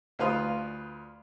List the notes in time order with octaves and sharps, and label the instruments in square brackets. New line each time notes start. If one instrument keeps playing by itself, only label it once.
[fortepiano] D2 F4 B4 F5 C6 D#6